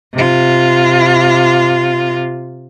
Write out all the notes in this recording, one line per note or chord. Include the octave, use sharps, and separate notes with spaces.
C3 F4